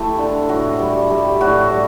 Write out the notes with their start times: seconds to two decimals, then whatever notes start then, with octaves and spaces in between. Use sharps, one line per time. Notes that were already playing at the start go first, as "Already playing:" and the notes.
Already playing: A3 E4 G4
0.18 D3
0.49 A2 F#4
0.79 G3
1.10 G3
1.41 A2 F#4
1.70 G3